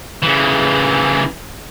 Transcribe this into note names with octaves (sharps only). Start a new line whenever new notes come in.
C#3 E3